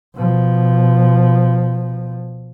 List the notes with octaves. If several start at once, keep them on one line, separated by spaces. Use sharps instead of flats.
B2 F3